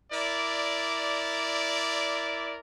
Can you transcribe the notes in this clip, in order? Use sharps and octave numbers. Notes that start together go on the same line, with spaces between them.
E4 A#4 D5